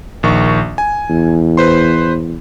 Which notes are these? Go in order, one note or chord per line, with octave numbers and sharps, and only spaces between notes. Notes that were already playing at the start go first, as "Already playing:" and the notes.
A#1 D#3 C#6
G#5
E2
B4 C5 C6